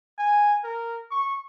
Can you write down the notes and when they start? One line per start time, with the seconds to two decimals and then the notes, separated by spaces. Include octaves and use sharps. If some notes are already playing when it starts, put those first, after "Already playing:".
0.18 G#5
0.64 A#4
1.11 C#6